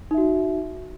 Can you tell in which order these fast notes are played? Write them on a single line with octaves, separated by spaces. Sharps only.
D#4 E5 F#4